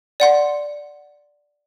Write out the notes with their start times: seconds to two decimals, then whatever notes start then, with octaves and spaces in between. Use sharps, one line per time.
0.20 D5 F#5 C6